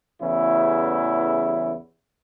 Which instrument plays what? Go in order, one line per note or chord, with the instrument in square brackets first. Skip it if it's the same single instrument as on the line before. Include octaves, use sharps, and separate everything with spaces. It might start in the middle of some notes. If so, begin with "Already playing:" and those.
[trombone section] A1 E2 C#3 E4